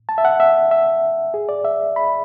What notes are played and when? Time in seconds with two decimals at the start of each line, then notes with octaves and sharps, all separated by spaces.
0.09 A5
0.18 E5
0.25 F#5
0.40 E5
0.71 E5
1.34 G#4
1.49 D5
1.65 E5
1.96 B5